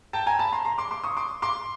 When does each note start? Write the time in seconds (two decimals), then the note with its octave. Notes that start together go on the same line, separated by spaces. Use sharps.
0.13 G5 A5
0.26 G#5 A#5
0.39 A5 B5
0.52 A#5 C6
0.65 A#5 C6
0.78 C6 D6
0.91 C6 D6
1.04 C#6 D#6
1.17 C6 D6
1.42 C6 D6